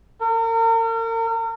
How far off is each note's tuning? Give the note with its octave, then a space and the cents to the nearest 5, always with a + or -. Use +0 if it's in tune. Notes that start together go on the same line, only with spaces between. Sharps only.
A#4 -40